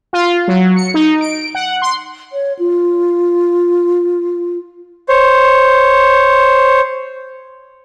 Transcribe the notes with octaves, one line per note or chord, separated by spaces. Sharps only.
F4
F#3
C#7
D#4
D7
F#5
C6
C#5
F4
C5 C#5